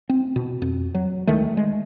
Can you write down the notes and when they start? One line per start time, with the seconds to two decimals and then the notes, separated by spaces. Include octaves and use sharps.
0.09 C4
0.36 B2
0.62 F2
0.95 F#3
1.27 D2 D#3 G#3 A3
1.57 G#3